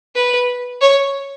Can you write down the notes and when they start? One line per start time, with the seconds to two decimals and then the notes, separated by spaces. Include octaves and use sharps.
0.15 B4
0.81 C#5